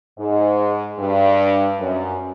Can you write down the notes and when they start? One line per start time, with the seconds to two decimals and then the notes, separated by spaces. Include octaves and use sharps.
0.18 G#2
0.99 G2
1.80 F#2